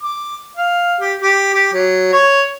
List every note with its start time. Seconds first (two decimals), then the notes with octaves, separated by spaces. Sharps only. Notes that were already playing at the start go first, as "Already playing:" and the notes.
0.03 D6
0.57 F5
1.01 G4
1.22 G4
1.54 G4
1.73 F#3
2.13 C#5